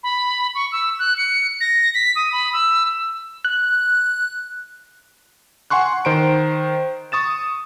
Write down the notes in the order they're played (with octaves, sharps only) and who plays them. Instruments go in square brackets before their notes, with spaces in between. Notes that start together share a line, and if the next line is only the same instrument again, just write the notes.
[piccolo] B5
C#6
E6
F#6
C#7
A#6
B6
D#6
B5
E6
[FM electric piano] F#6
[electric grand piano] F#5 G#5 C6 C#6 F#6
D#3 C5 A#5 D7
C#6 D#6 A6 E7